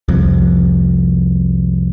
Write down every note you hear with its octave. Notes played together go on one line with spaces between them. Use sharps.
C2 F2